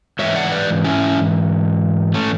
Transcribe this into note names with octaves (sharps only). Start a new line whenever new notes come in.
G#2 E3 C#5 E5
D5 F#5
C#5
B4 D5
C#4 E4
A3 C#4